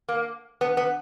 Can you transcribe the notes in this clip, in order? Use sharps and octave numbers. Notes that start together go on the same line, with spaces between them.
A#3
B3
B3